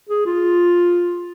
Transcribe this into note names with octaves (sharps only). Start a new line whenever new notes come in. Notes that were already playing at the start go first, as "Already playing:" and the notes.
G#4
F4